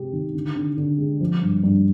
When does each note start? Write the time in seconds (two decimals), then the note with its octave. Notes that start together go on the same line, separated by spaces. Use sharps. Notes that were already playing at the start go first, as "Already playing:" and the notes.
Already playing: C3 G#3 G4
0.13 D#3
0.34 D3
0.56 D3
0.77 D3
0.98 G#3
1.20 F3
1.42 G2
1.63 G2